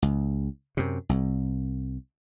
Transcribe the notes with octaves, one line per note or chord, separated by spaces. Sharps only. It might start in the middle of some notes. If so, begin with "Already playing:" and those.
C#2
F#2 C3
C2